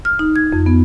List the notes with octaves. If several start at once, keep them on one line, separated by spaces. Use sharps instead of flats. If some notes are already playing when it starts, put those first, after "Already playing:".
F6
D#4
G#6
F2
B3